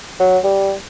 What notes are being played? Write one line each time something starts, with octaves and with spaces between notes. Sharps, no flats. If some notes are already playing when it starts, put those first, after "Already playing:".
F#3
G3